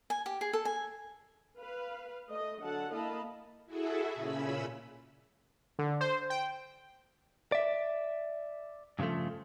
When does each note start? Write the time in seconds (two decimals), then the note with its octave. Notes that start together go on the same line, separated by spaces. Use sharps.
0.10 G#5
0.26 G4
0.41 G#4
0.53 A4
0.65 G#5
1.58 B4 F5
2.29 A3 D#5
2.60 D3 F#3 A4 F#5 A5
2.93 A#3 E4 D#5 F5 A5 B5
3.66 E4 F#4 G#4 A4 E5
4.14 A#2 C#3 C#4 B5 E6
5.79 D3
6.01 C5
6.30 G5
7.52 D5 E5
8.99 G2 C#3 E3 F3 A3